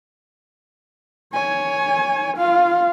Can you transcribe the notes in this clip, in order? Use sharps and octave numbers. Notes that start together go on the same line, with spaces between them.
C#5 G#5
F4 F5